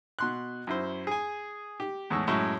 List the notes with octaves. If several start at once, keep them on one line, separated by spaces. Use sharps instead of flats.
B2 C6 F#6
F#2 E4 C5
G#4 G#5
G4
E2 A2 G#3 C#6 E6
F#2 A2 G#3 E5 C#6